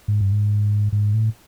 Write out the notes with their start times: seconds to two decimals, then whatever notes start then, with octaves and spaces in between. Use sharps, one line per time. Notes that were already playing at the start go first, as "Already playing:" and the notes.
0.08 G#2
0.21 G2
0.32 G#2
0.92 G#2
1.14 A2